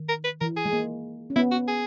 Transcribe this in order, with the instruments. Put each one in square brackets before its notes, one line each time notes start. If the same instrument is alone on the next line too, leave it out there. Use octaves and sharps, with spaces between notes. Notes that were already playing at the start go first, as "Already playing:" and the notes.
Already playing: [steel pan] D#3
[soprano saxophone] A#4
B4
[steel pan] E3 [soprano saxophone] A#4
[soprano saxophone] G#4
[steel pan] G#3
A#3
C#4
[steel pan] B3 [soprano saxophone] E4
[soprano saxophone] F#4
G#4